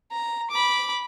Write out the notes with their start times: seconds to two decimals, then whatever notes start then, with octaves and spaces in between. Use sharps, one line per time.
0.12 A#5
0.51 B5 D6